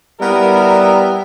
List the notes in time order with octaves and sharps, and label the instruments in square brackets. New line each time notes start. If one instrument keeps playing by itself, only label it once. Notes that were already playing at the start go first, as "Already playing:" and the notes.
[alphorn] G3 [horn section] B3 E4 E5 [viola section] A#4